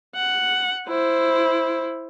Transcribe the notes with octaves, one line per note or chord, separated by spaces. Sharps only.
F#5
E4 C5